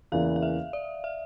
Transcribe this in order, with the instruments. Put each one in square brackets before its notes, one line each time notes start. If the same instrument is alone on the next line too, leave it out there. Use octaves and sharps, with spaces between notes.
[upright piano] E2 C#3 E3 A#3 E4 [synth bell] F5
[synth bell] F5
E5
D5
E5